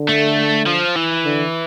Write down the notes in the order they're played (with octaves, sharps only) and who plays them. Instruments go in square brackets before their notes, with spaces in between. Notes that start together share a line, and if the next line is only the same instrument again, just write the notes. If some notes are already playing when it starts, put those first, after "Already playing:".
Already playing: [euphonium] D3
[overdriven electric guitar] A3
F3
E3
[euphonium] D3